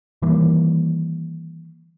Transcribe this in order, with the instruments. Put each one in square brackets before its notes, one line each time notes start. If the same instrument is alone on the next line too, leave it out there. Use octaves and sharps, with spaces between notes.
[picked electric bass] D#3 E3 G3 A#3